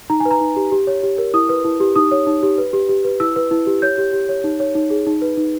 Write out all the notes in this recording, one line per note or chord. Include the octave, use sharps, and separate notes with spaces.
D#4 A#5
G#5
B4
A#5
D#4
G4
G4
C#5
G4
A#4
E4 D#6
B4
E4
G4
D#4 D#6
C#5
D#4
G4
B4
G4
G4
B4
E4 E6
B4
E4
G4
C#5 G6
G4
G4
C#5
D#4
C#5
D#4
G#4
D#4
B4
D#4